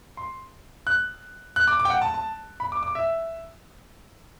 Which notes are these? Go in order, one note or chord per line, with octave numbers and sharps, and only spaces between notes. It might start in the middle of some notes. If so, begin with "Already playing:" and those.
C6
F#6
F#6
D6
D6
G5
F#5
A5
A5
B5
D6
D6
E5